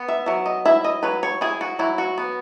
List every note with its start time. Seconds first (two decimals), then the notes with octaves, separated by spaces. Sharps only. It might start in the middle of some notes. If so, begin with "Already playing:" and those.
Already playing: B3
0.08 E5
0.26 F#3 E5
0.46 D#5
0.65 E4 E5
0.84 D#5
1.03 F#3 B4
1.23 C#5
1.41 E4 G#4
1.61 F#4
1.79 F#3 E4
1.98 F#4
2.18 B3